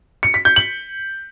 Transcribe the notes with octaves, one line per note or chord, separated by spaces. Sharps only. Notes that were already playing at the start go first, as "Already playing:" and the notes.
C#7
B6
G6
F#7